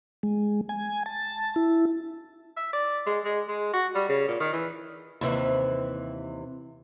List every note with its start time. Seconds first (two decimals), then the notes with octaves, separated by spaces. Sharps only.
0.23 G#3
0.69 G#5
1.06 A5
1.56 E4
2.57 E5
2.73 D5
3.06 G#3
3.25 G#3
3.48 G#3
3.73 F#4
3.95 G3
4.09 C#3
4.28 A#2
4.40 D#3
4.53 E3
5.21 D#2 C3 E3